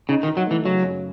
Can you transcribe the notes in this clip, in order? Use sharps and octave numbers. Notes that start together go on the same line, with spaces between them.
C#3 D#4
D#3
D#4
F#3
E3 A3
C#3 F#3
F#2